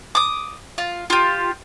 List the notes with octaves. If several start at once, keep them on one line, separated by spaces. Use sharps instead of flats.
D6 D#6
F4
F4 G4